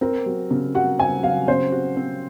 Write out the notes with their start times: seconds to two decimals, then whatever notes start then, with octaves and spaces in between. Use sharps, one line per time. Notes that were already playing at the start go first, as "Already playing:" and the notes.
0.01 C4 A#4
0.26 F#3
0.51 C#3
0.75 F#4 F#5
0.99 C4 G#5
1.23 F#3 F5
1.48 C#3 C5
1.72 F#4
1.97 C4